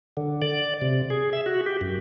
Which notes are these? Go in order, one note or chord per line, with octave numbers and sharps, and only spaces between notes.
D3
D5
C3
G#4
E5
F#4
G4
F#2